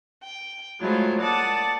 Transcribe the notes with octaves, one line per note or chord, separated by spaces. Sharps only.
G5
F#3 G#3 A3 E4 F4 C5
A#3 D5 F#5 A5 D#6 A6